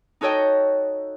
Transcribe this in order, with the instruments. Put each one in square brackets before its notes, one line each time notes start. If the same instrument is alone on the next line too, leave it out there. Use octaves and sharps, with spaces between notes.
[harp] D#4 F#4 A4 C#5 D#5 G5